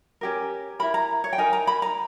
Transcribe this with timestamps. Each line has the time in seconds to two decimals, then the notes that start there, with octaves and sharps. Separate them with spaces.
0.21 C#4 G4 A#4
0.79 E4 A#4 B5
0.94 A#5
1.24 C#5
1.33 G5
1.38 D#4 A#4 G#5
1.53 A#5
1.67 B5
1.82 A#5